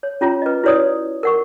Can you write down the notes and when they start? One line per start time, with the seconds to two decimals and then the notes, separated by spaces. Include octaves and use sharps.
0.03 C#5
0.21 C#4 F4 C#5 A#5
0.42 B4 D#5
0.63 E4 F#4 B4 C#5 D5 D#6
1.23 A#4 F#5 C#6